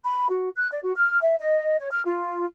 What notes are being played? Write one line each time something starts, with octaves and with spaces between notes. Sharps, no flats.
B5
F#4
F#6
D5
F#4
F6
E5
D#5
C#5
F6
F4